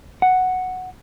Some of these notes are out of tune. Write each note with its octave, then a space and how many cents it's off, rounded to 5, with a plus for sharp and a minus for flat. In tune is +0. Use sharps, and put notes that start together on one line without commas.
F#5 +0